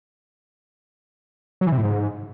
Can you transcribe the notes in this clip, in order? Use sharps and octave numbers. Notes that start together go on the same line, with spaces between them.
F#3
E3
C3
A2
G#2